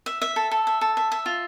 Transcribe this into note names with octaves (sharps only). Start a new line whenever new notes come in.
E5
E5
A4
A4
E5
A4
E5
E5
F4